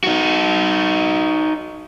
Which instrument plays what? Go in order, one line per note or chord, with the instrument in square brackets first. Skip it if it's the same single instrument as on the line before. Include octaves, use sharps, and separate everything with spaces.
[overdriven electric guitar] D#4 F#4